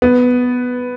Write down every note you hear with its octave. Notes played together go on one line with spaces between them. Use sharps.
B3